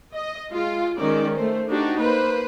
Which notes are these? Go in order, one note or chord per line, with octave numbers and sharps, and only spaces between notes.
D#5
G#3 F4
D#3 G#3 C#4 D#4 D5
A3 C5
D4 D#4 F#4 G4
A#3 B4 C5